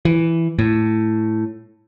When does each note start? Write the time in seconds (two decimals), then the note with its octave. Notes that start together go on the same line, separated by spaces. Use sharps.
0.05 E3
0.59 A2